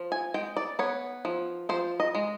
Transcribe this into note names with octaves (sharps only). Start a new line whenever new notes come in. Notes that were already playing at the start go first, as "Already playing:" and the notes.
Already playing: F3
G#5
G#3 G5
D5
B3 C#5
F3
F3 C5
D#5
G#3